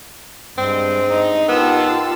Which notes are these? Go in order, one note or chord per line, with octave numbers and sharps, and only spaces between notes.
G2 G#3 C4
D#4
D#3 B3 F4 G4 A5 E6